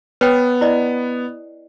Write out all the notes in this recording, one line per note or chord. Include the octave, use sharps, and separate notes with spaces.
B3 B4 C#5 G5
E4 D5 D#5